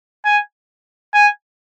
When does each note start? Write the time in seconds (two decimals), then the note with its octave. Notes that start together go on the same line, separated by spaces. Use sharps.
0.25 G#5
1.14 G#5